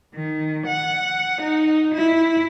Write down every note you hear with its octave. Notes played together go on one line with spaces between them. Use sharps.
D#3
F#5
D#4
E4